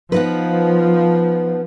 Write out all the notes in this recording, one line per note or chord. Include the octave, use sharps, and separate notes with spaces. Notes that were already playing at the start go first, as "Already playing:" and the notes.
F3 B3 D#4 B4